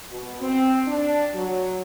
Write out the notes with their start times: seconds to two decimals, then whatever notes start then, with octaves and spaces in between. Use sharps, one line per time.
0.10 B2
0.41 C4
0.87 D4
1.34 F#3